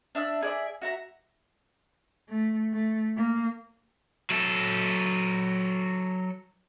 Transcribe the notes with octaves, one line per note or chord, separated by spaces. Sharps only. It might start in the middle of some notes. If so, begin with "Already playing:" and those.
D4 E5 D6 E6
G#4 D5 E5
F#4 E5 A#5
A3
A3
A#3
F#3 A4